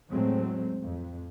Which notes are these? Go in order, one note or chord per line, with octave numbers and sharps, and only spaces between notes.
E2 A2 F#3 G#3 A3 C4
F2